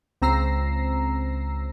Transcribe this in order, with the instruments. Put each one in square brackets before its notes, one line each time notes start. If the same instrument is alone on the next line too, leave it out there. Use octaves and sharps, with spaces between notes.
[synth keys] C#2 C4 A#5 E6 A#6 C7